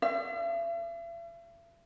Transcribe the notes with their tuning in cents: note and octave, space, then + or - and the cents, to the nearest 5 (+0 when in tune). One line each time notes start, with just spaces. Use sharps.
E5 +45